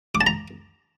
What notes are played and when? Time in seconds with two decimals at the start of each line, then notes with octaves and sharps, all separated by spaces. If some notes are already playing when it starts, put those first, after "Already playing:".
0.15 D6
0.21 A5
0.27 A#5